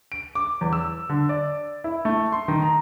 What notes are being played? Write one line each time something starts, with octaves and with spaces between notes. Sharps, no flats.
D7
D6
E2
E6
D3
D5
E4
A3
C6
D#3
A#5